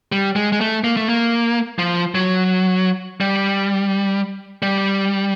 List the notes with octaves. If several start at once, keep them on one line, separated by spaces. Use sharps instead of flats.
G3
G#3
G#3
A3
A#3
A3
A#3
F3
F#3
G3
G3